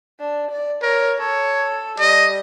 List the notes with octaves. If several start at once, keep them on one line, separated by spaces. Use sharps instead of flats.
D4
D5
A#4 C#5
A4 C#5
G3 D#5